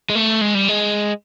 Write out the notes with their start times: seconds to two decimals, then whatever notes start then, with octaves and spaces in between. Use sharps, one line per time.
0.10 G#3
0.15 A3
0.41 G#3
0.54 G3
0.68 G#3